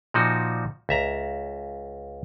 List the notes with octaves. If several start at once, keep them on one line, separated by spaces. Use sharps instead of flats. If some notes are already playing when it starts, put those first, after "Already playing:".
A#2 F3 D#4 F#4
C#2 E5 A#5